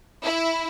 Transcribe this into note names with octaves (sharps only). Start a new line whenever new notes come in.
E4